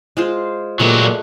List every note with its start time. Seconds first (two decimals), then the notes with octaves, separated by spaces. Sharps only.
0.17 G#3 F4 C5
0.79 A#2 F#3 G#3 A3 G4 B4